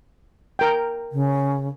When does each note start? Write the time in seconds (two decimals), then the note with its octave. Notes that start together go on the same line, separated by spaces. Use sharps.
0.59 A#4 G5
1.12 C#3